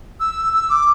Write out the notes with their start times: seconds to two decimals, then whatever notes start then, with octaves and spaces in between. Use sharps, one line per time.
0.20 E6
0.53 E6
0.70 D6